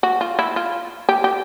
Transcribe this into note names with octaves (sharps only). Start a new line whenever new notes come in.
F#4
F4
E4
F4
G4
G4